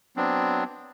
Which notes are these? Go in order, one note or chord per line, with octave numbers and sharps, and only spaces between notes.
F#3 B3 C4 D4